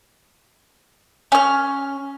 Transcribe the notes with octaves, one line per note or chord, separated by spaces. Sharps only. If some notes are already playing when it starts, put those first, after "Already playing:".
C#4 F6